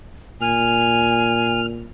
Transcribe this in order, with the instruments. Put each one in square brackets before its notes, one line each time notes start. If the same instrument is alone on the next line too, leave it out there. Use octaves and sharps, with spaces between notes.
[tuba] A#2 [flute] G#5 [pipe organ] F6